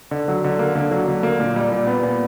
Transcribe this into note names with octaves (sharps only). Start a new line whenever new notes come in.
D3
F#3
D3
A#3
D3
F#3
D3
A#3
A#2
G3
A#2
B3
A#2